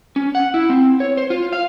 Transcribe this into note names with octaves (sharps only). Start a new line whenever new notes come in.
C#4
F#5
E4
C4
C#5
C5
F4
F5